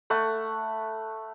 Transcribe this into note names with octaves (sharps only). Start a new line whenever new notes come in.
A3 F#5 B5